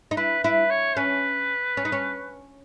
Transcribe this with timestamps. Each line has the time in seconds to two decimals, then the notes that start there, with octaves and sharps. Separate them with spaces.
0.11 D#4
0.17 E4 B4
0.44 E4 B4
0.70 C#5
0.97 C#4 B4
1.77 C#4
1.85 D#4
1.92 C#4